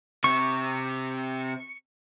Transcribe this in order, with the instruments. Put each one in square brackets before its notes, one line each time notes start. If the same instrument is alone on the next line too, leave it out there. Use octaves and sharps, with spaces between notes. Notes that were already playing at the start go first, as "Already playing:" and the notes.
[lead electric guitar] C3 C4 [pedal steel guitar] C#6